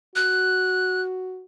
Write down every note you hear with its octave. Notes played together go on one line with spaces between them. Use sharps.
F#4 F#6